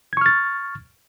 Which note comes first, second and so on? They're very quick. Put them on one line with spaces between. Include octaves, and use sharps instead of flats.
G#6 C#6 F6 A6